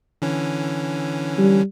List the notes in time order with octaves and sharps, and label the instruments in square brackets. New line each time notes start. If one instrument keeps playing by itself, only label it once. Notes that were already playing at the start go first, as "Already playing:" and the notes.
[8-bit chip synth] D3 E3 C#4
[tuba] G3